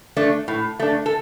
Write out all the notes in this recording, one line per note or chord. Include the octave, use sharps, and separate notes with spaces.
A3 D4
A2
A3 D4
A4